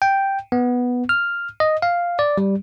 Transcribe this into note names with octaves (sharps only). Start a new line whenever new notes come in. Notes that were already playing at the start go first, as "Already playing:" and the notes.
G5
B3
F6
D#5
F5
D5
G3